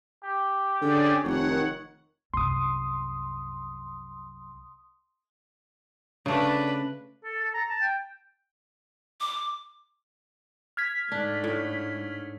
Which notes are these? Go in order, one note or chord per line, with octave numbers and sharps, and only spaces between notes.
G4
D3 C#4 G#4 D5
F1 D#3 C#5 F#5
C2 F#2 C6 D#6
C#3 A3 D4 B4
A4
A4
A#5
A5
G5
D6
F6 G#6 B6
G#2 A3 D4
A2